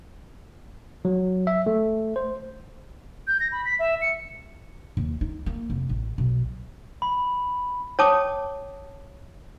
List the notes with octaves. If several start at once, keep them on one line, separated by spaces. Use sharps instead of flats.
F#3
E5
A3
C5
G6
A#6
B5
B6
E5
C#7
D#2
D#4
A#3
F1
A1
B1
B5
C#5 G5 A5 D6 D#6